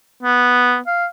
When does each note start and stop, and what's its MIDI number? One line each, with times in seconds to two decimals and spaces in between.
0.23 0.79 59
0.87 1.06 77